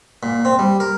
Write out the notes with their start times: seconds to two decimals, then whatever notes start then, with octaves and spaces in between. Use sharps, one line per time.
0.23 A#2
0.45 C4
0.59 G3
0.80 A#4